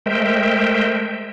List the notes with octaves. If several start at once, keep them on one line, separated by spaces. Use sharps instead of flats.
G#3 A3 A#4 C5 E5 G5